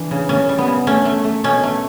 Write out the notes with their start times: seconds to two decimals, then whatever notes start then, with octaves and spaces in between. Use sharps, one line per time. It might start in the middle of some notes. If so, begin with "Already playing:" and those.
Already playing: E3 D4
0.11 C#3
0.29 C#3 C#4
0.49 G3
0.58 B3
0.67 C#3
0.87 A3 C#4
1.05 A3
1.24 A3
1.44 B2 C#4
1.63 A3